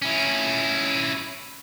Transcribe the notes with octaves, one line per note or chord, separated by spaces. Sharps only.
C#4 E4